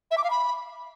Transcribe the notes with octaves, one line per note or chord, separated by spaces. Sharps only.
E5
D6
F5
B5